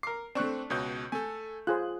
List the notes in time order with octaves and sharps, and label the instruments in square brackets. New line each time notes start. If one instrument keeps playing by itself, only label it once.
[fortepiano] A#4 D6 [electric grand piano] C7
[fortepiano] A3 D4 [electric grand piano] C4 C#6 F#6
[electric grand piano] C#2 B2 G6 [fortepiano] C#5
[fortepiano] A3 [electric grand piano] A4 G#5
[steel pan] F4 G#4 C5 [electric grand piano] F#6